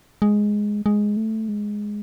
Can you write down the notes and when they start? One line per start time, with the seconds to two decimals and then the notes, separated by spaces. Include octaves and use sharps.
0.22 G#3
0.86 G#3
1.17 A3
1.49 G#3